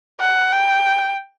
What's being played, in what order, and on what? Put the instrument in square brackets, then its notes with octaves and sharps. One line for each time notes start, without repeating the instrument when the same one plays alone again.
[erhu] F#5
G5